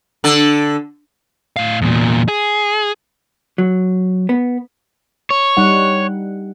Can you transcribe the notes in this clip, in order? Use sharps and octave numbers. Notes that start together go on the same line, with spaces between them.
D3 A4
A2 F5
E2 A#2
G#4
F#3
B3
C#5
G3 D#4 F#5